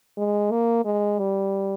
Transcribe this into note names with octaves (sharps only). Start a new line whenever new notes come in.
G#3
A#3
G#3
G3